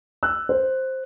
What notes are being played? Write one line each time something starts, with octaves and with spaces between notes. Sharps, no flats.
E6 F#6
C5